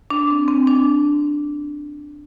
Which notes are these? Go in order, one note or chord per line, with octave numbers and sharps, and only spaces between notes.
D4
C4
C4
D4